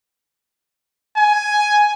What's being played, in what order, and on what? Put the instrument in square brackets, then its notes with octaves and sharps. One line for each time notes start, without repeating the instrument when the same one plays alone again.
[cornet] G#5